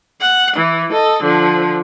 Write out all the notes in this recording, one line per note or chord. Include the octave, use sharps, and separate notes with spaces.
F#5
E3
A4 D#5
D3 F3